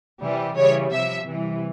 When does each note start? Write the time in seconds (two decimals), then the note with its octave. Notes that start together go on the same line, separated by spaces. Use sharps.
0.22 C3 E3 G3
0.56 C#3 E3 G3 C#5
0.92 C3 F3 E5
1.27 C3 E3 G3